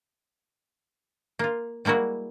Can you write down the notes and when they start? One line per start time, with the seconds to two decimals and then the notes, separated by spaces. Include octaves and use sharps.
1.39 A#3 F4
1.85 G3 G#3 A#3 E4 F#4